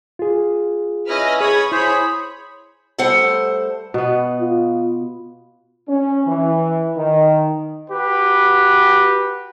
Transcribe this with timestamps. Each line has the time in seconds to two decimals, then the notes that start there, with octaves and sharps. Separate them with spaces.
0.19 F4 G#4
1.09 C#4 E4 B4 D#5 F6
1.40 G#4 C#5 B5 D#6 G#6
1.72 E4 G#4 C5 C#5 B5
2.98 G3 A3 A4 C5 F#5
3.94 B2 B3
4.40 F4
5.89 C#4
6.27 E3
6.97 D#3
7.89 F#4 G4 B4